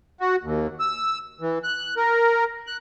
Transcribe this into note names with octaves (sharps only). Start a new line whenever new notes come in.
F#4
D#2
E6
E3
F#6
A#4
F#6